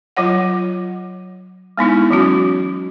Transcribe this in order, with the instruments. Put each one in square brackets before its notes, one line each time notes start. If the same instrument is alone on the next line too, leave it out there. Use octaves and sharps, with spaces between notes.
[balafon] F#3 F4 C#5 F#5
G#3 B3 D#4 E4
E3 F#3 C#4 F#4